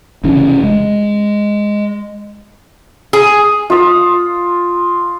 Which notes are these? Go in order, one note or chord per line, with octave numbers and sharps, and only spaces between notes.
F1 C#3 E3 C#4
G#3
G#4
F4 D#6